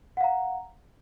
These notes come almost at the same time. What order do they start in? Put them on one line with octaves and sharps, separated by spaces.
F#5 F5 A#5